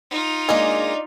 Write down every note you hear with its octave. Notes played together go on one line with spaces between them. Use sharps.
D#4 F4
G#3 A#3 D4 G#4 D#5